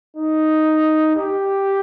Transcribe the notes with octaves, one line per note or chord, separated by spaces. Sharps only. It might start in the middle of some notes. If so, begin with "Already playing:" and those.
D#4
G4